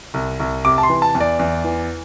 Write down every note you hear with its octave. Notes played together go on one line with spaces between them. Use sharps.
C2
C2
C3 D6
A5
C6
E3
A5
E2
D5
E2
E3